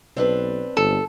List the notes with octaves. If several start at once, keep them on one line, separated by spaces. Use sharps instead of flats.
B1 C4 D4 B4
G1 A4